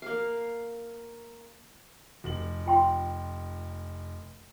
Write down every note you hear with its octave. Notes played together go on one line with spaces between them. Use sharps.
A#3 F5
F1 F#7
F4 G5 C6